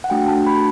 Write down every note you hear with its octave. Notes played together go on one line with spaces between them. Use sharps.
F#5
A3 D4 F#4 G5
A5
B5